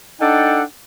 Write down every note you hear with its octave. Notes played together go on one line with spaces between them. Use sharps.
D4 D#4 A4 F#5 G5